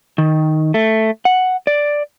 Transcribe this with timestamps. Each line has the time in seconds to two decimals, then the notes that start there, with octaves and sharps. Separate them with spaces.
0.18 D#3
0.74 A3
1.25 F#5
1.67 D5